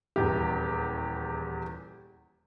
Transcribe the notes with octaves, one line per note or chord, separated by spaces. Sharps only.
D#1 E2 G4